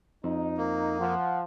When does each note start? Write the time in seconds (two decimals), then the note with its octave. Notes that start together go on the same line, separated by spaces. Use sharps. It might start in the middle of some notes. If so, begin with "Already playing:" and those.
0.24 F2 D#4
0.58 A#3
0.99 F3 F#5